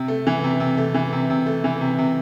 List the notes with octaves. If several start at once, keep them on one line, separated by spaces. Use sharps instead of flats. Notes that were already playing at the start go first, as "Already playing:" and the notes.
Already playing: C3
A3
E3
C3
C3
A3
E3
C3
C3
A3
E3
C3
C3